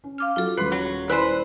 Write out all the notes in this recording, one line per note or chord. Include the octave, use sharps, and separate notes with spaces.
C#4
F5 D6 F6
F#3 F4 F#4 A4
D#1 C#4 B4 C6 C7
F#3
E4 B4 C5 D5 G#5